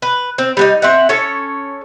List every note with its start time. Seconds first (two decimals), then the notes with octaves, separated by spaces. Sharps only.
0.02 B4
0.38 C4
0.57 G3 B3 D#4
0.82 C4 E5 F#5
1.09 C#4 A4 C#5